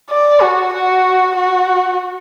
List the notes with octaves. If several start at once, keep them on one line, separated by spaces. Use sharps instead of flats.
D5
F#4
F#4
F#4